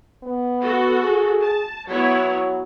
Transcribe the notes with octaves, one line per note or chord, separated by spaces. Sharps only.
B3
F#4 A4
G#4
A5
F#3 B3 E4 C#5